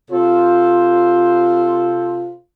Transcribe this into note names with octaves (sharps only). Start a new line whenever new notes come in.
C3 F4 A4 C5